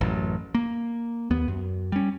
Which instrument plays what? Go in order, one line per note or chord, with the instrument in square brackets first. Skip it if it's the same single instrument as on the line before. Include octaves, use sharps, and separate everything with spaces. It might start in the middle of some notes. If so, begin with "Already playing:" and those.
[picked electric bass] A1 F#2
A#3
D#2 B3
F#2
G3 C#4